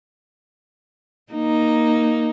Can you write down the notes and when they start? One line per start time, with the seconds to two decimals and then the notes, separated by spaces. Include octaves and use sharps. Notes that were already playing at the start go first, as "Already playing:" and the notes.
1.33 A#3 D#4